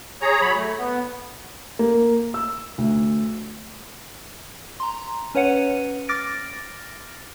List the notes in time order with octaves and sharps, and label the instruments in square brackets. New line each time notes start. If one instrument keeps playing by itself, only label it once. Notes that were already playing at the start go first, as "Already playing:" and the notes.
[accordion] G#4 C#5 A#5
F#3 C#5 B5
A3
B3
[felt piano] A#3
E6
D2
[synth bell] A#5 C6
C#4 B4 C#5 F#5 C#7 D#7
D6 F6 A6 A#6 D7